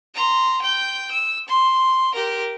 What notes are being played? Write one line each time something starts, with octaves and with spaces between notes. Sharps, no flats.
A#5 C6
G5 G6
E6
C6
G4 A#4